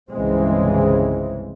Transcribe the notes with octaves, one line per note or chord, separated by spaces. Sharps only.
G1 C2 C#3 E3 G#3 C4